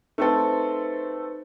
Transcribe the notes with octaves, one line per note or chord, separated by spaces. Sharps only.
A3 C4 D#4 A4 B4 C5